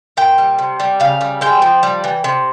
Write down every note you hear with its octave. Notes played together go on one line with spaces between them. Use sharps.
A#2 G5
G3
C3
G3
C#3 F5
G3
G#3 G5
F3
G3
E3
C3